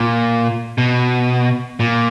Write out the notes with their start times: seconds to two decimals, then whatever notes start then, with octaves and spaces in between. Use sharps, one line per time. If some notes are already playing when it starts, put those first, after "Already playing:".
Already playing: A#2
0.78 B2
1.80 A#2